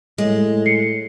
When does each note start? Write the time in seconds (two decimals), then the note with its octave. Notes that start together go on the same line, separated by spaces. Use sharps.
0.18 A2 G#3
0.66 C7 C#7